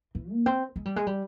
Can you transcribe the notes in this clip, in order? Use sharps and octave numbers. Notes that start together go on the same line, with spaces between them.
E3
A#3
C4
G#3
G3
G#3
G3